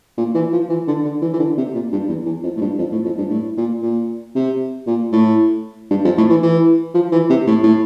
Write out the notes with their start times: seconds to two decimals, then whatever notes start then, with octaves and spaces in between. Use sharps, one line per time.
0.18 A#2
0.35 E3
0.53 F3
0.70 E3
0.88 D3
1.05 D3
1.22 E3
1.34 E3
1.39 D3
1.58 C3
1.74 A#2
1.92 G2
2.09 E2
2.26 E2
2.44 F2
2.57 A2
2.61 G2
2.79 F2
2.92 A2
3.05 F2
3.18 G2
3.30 A2
3.57 A#2
3.82 A#2
4.35 C3
4.87 A#2
5.12 A2
5.91 G2
6.05 F2
6.18 A2
6.30 E3
6.43 E3
6.95 F3
7.12 E3
7.30 C3
7.47 A2
7.64 A2